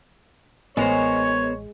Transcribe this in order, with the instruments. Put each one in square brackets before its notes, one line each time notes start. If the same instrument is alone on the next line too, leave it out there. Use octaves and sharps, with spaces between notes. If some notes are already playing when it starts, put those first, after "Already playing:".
[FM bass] A1 [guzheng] G#3 [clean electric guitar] B3 A#4 C5 [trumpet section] C#5